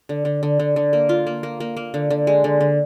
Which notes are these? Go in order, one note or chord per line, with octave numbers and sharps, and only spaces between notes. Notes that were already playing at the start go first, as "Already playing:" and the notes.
D3
D3
D3
D3
D3
A#3
F4
A#3
A#3
A#3
A#3
D3
D3
G#3
D3
D3